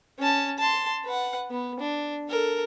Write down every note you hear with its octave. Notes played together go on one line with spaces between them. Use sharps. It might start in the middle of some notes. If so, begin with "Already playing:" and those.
C#4 A5
A5 C6
B4 F#5
B3
D4
A4 A#4